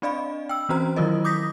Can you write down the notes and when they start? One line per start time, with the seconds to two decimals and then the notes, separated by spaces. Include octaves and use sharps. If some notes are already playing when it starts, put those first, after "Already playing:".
0.02 C4 D4 D5 D#5 F5 B5
0.49 G5 E6
0.69 E3 C4 C#4 F#4 C5 A#5
0.96 D#3 F#3 E4 F4 A#4 D#5
1.24 D6 D#6 G6 A#6 B6